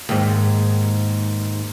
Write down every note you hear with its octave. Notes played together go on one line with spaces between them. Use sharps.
D#2 G#2